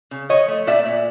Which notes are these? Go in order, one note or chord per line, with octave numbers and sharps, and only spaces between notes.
C#3
F3 C#5 D#5
A3
A#2 D5 E5
A#2